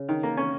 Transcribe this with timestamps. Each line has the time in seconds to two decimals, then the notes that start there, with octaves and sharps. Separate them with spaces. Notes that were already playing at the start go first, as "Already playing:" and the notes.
Already playing: C#3
0.09 D#3
0.23 A#3
0.37 C#4